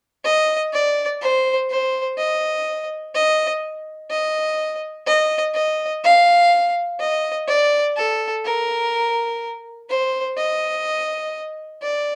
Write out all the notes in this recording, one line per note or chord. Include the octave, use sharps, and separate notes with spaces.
D#5
D5
C5
C5
D#5
D#5
D#5
D#5
D#5
F5
D#5
D5
A4
A#4
C5
D#5
D5